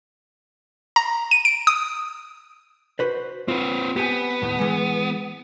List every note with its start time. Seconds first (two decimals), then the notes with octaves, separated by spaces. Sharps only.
0.96 A#5
1.31 D#7
1.45 D7
1.67 D#6
2.99 F#4 B4 C5
3.48 C4 F4 B4
3.96 B3 G4 G#5
4.42 D#2 A2
4.59 E3 G#3